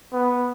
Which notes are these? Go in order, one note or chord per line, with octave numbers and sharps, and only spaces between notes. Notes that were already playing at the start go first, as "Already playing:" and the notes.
B3